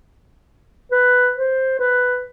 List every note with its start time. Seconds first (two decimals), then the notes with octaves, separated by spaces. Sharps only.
0.92 B4
1.36 C5
1.79 B4